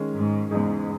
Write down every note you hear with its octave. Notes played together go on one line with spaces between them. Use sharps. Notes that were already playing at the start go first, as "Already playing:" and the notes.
Already playing: D#3 G#3 C#4
G#2
E2 G#2 C#3 G#3 D#4 G#4